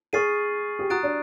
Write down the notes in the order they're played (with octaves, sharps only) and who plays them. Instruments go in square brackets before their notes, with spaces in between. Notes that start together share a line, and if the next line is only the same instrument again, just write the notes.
[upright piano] G#4 [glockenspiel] C#6 F6 A6 C7 D#7
[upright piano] G4
[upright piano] F#4 [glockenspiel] A#5 D#6 F#6 A6 D7
[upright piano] D4